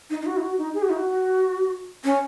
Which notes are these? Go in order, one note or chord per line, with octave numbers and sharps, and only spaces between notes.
D#4
D#4
F#4
D#4
F#4
D#4
G#4
F#4
D#4
F#4
C#4